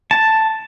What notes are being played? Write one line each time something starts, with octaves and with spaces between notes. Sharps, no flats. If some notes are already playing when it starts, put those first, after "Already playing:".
A5